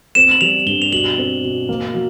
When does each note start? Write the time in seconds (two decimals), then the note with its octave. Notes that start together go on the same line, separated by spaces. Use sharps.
0.15 C4 E7
0.31 F#7
0.41 G3 F7
0.66 G2 G7
0.82 F7
0.92 B2 F#7
1.18 C4
1.42 B2
1.69 A#3
1.94 F#3